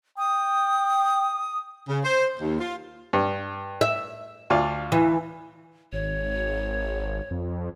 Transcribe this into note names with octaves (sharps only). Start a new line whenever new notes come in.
G5 D#6
C#3
C5
D#2
F4
G2
E5
D2 F4 D5
E3
G#1 C#5
F2